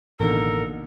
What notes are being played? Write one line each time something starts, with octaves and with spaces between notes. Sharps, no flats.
A1 D#2 B2 D3 A4 A#4